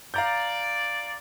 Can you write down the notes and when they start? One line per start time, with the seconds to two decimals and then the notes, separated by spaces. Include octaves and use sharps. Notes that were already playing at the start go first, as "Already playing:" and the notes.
0.14 D5 F5 A#5 G6